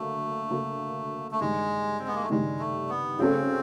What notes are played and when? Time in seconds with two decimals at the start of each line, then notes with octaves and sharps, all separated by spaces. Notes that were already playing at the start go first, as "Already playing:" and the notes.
Already playing: D3 F#3 A3 A#3
0.50 D3 F#3 A#3
1.31 A3
1.40 G2 D#3 G3 G#3
2.00 C4
2.07 B3
2.15 A#3
2.22 A3
2.30 G2 D#3 G3 G#3
2.59 A3
2.89 B3
3.19 C#3 F#3 A3 C4 C#4